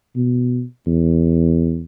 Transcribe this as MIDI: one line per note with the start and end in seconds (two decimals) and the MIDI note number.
0.16 0.63 47
0.87 1.85 40